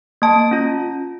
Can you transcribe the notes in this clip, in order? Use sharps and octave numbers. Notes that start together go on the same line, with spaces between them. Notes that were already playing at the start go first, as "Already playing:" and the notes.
A#3 A5
C#4 F4